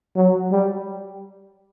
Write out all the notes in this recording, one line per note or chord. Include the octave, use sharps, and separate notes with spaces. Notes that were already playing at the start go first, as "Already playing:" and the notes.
F#3
G3